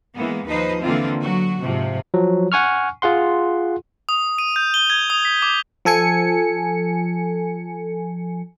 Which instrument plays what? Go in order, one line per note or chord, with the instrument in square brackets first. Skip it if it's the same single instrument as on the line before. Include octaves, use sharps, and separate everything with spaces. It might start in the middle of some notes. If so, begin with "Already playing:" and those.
[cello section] E3 G#3 A#3 B3
D#2 F3 D#4 B4 C5 D#5
D3 E3 A#3 C4 F4
F#3 F#4
G#2 C3 F3
[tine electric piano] F3 F#3
F#5 G#5 C#6 F6
F4 G#4 F#5 C6
[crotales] D#6
D#7
G6
G7
G#6
D#6
B6
D6
[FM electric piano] F3 A4 G#5 C#7